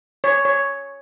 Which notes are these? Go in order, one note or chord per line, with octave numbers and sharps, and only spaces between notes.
C#5
C#5